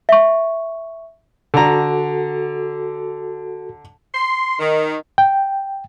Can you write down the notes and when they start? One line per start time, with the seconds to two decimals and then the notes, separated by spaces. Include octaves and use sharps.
0.09 E5 C#6
1.54 D3 F#4 A4 A#5
4.15 C6
4.59 D#3
5.18 G5